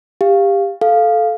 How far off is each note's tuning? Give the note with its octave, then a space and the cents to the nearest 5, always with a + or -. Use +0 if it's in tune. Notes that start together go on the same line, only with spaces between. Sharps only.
G4 +20 F5 +0
A4 -10 F5 +0